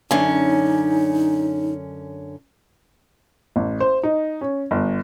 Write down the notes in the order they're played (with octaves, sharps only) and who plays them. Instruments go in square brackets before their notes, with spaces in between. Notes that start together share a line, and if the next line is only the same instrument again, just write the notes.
[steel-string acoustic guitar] F#2 D3 C#4 [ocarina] D#4
[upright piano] A1
C5
D#4
C#4
G1